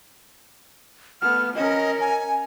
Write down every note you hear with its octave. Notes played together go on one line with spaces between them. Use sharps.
A3 B3 F6
C#4 A#4 D#5
G#5